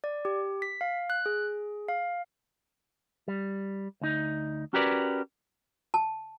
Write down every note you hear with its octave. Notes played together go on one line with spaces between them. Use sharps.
D5
G4
B6
F5
F#6
G#4
F5
G3
D2 D#4
C#4 F#4 G4 A#4 B4 D5
A5